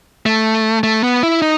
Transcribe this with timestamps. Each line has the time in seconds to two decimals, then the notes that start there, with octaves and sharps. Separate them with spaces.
0.26 A3
0.83 A3
1.03 B3
1.23 E4
1.42 D#4